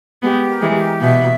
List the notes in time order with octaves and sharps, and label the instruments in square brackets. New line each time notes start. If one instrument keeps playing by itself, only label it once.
[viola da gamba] G#3 B3 [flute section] G4
[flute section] A#4
[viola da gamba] E3 G#3
[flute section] G4
[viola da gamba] B2 [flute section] E5